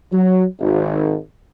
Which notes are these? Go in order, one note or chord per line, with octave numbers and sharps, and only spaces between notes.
F#3
G#1